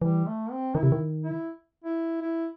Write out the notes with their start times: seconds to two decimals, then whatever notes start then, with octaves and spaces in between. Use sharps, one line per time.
0.02 E3 G3
0.27 A3
0.51 C4
0.75 D#3 E4
0.83 C3
0.92 D#3
1.24 E4
1.84 E4
2.21 E4